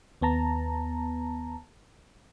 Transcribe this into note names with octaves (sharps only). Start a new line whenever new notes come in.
D#2 B3 A5 A#5